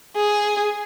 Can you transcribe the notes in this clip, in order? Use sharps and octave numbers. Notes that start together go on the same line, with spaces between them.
G#4